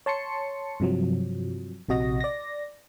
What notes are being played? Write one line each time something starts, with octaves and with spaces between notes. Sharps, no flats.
C#5 A5 C6 C#7
G2 C3 F3 F#3
A#1 C3 F#4 D#5 A#6
D5 A#6